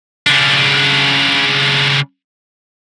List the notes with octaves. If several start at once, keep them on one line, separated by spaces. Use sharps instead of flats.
C#3 D4